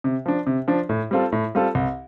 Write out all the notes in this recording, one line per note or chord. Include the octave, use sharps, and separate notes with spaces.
C3
F3 D4
C3
F3 D4
A2
G3 C4 F4 A4
A2
G3 C4 F4 A4
C2